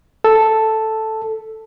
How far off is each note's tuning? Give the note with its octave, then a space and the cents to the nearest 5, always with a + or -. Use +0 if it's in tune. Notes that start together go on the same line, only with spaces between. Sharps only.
A4 +0